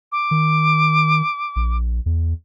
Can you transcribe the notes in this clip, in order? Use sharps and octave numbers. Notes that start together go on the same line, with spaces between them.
D6
D#3
A#1
E2